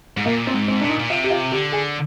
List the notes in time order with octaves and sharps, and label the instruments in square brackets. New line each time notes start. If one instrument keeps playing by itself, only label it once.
[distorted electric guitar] G#2
[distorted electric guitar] A#2 [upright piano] A#3
[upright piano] C4
[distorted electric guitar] G#2
[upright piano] C4
[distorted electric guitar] A#2 [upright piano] D4
[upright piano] D#4
[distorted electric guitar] A#2
[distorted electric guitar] C3 [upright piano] F4
[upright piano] G4
F4
[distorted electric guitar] D3 [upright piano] G4
[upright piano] G#4